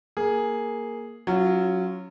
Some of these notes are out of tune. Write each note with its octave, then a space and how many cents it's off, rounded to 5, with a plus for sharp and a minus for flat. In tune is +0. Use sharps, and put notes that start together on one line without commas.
A#3 +0 G#4 +0
F#3 -5 C#4 +0 F4 -25